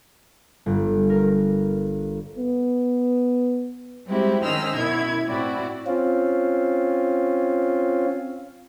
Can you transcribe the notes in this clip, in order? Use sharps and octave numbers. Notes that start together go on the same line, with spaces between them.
G1
A#4
B3
G3 G#3 C4 E4 F#4 G4
D#3 C#4 C5 D#5 E6 F6
F#2 B2 E4 G#6
A2 C4 E4 F#4 D5
C4 C#4 F4